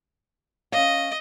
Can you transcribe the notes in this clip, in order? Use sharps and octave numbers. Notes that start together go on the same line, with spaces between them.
C#4 D#5 F5